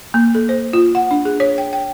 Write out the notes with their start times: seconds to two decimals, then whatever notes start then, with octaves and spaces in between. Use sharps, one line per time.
0.14 A#3
0.35 A4
0.49 C5
0.73 F4
0.95 F#5
1.11 D4
1.25 G#4
1.40 C#5
1.58 G5
1.73 G5